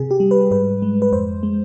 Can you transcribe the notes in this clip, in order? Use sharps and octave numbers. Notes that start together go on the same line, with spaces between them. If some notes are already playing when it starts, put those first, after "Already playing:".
Already playing: C3 G#4
G4
G3
B4
G#2 B4
G#3
B4
F2 C5
G#3